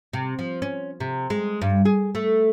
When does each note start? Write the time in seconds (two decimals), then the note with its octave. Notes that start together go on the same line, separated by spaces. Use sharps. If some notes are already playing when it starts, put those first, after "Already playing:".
0.13 C3
0.39 F3
0.62 C#4
1.00 C3
1.30 G#3
1.62 G2
1.85 G#4
2.15 A3